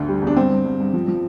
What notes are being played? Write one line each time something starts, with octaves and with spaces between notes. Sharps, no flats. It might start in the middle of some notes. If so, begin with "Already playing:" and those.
Already playing: D2 D3
G3
E2
D4
G2 C4
G2
G2
G2
F3
F3